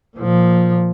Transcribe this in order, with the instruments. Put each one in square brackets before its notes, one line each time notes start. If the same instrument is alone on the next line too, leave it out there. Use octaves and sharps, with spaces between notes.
[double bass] A#2 F3